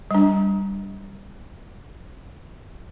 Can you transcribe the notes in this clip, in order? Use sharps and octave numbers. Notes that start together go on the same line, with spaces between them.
G3 D4